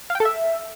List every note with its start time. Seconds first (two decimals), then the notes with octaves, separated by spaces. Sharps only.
0.10 F5
0.15 G5
0.20 A4
0.25 E5